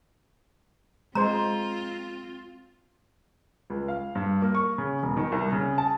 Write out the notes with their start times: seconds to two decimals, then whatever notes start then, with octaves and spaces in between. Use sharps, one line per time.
1.15 G#3 C4 F4 C5 A#5
3.70 C#2
3.88 F5
4.15 G2
4.42 A#3
4.55 C#6
4.78 C#3
5.03 E1
5.17 D#3
5.32 C2
5.52 C#3
5.78 A5